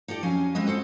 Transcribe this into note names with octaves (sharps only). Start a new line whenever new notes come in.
D#4 G4 A4 D5
F2 F#3 C#4 F5 G#5
G#3 C4 B4 D#5
F#4 A4 C5